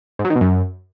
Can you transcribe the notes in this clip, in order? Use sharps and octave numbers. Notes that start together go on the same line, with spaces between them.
G#2
F#3
D#3
B2
F#2